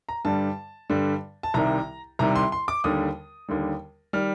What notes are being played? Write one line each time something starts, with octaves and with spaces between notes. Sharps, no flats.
A#5
G2 D3 G3 A5
G2 D3 G3
A5
C2 C3 D#3 G3 A#5
C2 C3 D#3 G3 A#5
C6
C6
D6
D#2 D3 G3 D#6
D#2 D3 G3
D#3 G3 F6